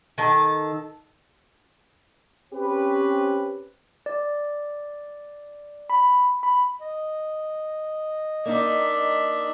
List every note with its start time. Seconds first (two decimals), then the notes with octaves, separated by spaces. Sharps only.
0.18 D#3 A4
2.53 C4 C#4 G4 B4
4.06 D5
5.90 B5
6.43 B5
6.81 D#5
8.46 A#3 D4 D#4 E5